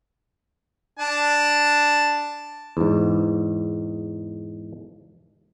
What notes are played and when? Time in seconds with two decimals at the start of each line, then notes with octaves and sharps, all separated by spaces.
0.99 D4 A5
2.77 E2 G#2